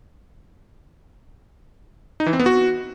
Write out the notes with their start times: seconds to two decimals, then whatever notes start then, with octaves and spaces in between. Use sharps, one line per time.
2.20 D#4
2.26 E3
2.33 C4
2.39 B3
2.46 F#4